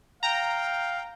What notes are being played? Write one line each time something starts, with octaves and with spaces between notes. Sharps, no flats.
F5 G5 A#5